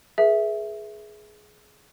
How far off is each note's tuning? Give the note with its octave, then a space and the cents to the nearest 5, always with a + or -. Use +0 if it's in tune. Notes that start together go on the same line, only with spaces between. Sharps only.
G#4 +15 B4 -40 E5 +0